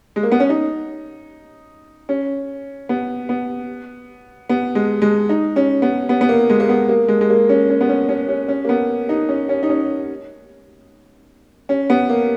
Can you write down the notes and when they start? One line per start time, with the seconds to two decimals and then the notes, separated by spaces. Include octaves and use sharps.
0.16 G#3
0.23 A#3
0.32 B3
0.40 C#4
0.49 D#4
2.09 C#4
2.89 B3
3.29 B3
4.49 B3
4.75 G#3
5.02 G#3
5.29 D#4
5.56 C#4
5.82 B3
6.09 B3
6.21 B3
6.29 A#3
6.50 G#3
6.60 A#3
6.69 B3
6.89 A#3
7.08 G#3
7.21 G#3
7.30 A#3
7.49 C#4
7.70 C#4
7.81 B3
7.89 C#4
8.09 C#4
8.29 C#4
8.48 C#4
8.65 A#3
8.69 B3
9.09 D#4
9.29 C#4
9.49 C#4
9.63 D#4
9.69 C#4
11.69 C#4
11.90 B3
12.09 A#3